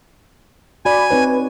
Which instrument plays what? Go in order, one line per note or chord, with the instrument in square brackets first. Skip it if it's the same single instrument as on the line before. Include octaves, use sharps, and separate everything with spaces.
[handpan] F#4 D5 [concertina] G#5 [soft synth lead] B5
[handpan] C4 D#4 C#5 [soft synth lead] B4